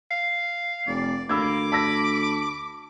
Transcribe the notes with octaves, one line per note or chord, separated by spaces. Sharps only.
F5
F1 D5
D2 A#3 B5 D6 E6 G#6
A5 B5 E6 A#6